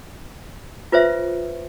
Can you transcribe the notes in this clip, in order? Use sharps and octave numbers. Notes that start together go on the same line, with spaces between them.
F4 B4 C5 E5